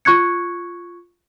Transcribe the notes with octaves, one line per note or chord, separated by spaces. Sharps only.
F4 C#6 F#6 G#6 C#7